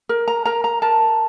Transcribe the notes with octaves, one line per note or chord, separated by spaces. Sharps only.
A#4
A#5
A#4 A#5
A#5
A#4 A5